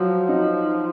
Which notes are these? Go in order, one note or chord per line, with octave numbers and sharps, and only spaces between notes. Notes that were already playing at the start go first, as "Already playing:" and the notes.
Already playing: F3 F#3
D#4